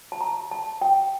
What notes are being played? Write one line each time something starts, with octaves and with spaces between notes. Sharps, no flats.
A5
A#5
A5
G5